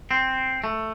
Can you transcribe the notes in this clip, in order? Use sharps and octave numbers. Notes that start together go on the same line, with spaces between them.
C4
A3